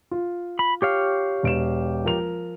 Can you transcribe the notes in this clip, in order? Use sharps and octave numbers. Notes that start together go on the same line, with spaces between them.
F4
B5
G4 C#5 F5
E1 D7 E7
F3 A#4 F7